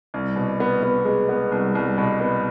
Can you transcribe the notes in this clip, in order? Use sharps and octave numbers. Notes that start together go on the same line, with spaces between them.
C2
B2
B3
B3
G#3
B3
C2
C2
B2
B3